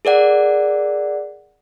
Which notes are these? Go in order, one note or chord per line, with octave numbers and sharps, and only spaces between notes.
G#4 A#4 D5 F#5